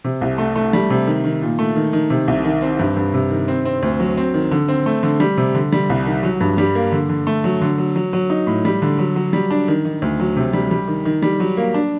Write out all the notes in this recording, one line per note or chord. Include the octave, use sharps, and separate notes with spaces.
C3
C2
A3
A3
G3
C3
D#3
D#3
A#2
A3
D#3
D#3
C3
C2
D#3
C4
G2
G2
C3
D#3
C4
C4
D2
F#3
C4
D#3
D3
C4
A3
D3
G3
C3
D3
G3
C2
D#3
F#3
G2
G3
A#3
D3
D3
A3
F#3
D3
F#3
F#3
F#3
D#4
A2
G3
D3
F#3
F#3
G3
D4
D#3
D#3
D2
F#3
C3
G3
G3
D#3
D#3
G3
F#3
A#3
D4